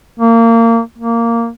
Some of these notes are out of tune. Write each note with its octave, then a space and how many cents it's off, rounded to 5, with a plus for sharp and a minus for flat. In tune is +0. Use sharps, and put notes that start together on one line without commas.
A#3 -25
A#3 -10